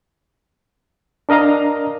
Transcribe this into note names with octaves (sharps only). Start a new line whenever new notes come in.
D4 A#4 D#5 F5 A#5